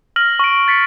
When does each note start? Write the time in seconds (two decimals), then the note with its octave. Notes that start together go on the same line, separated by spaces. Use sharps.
0.16 F6 A#6 F#7
0.39 C#6 D7
0.68 A6 B6 C#7